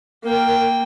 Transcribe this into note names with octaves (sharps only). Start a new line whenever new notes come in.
A#3 A#4 G5